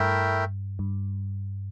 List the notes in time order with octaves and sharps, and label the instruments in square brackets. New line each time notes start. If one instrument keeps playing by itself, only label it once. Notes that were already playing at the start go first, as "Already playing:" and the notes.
Already playing: [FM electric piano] G2 [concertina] A3 E4 A#4 E5 G5
[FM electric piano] G2